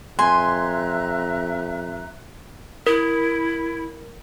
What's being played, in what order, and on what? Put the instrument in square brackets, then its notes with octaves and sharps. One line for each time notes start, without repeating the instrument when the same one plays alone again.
[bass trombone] F2 [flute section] E5 A#5 F#6 [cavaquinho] G#5 [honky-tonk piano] C6
[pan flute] E4 [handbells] A#4